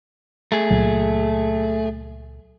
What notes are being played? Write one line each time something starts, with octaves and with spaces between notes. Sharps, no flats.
A3 G#4
C#2 A#2 F#3